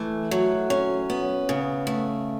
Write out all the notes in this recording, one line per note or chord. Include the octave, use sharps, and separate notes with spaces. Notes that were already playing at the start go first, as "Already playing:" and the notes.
Already playing: E3 A3
F#3
C#4
B3
C#3
A3